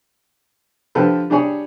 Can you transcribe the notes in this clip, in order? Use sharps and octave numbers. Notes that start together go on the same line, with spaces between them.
D3 F3 G4 A4 B4
G3 D4 G4 G#4 C#5